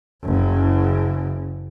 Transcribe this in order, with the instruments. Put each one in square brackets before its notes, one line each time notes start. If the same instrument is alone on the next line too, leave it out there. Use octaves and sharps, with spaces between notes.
[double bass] F#1 C#3